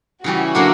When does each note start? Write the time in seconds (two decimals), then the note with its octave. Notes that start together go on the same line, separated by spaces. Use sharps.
0.24 C#3 E3 G3 C#4 F#4
0.55 D3 F#3 A#3 D4